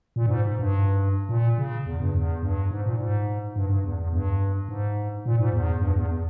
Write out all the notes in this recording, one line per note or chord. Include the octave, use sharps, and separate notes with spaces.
A#2
G2
G#2
G#2
G2
A#2
C#3
E2
G2
E2
G2
G#2
A#2
G#2
G2
G2
E2
E2
G2
G#2
A#2
G#2
E2
G2
E2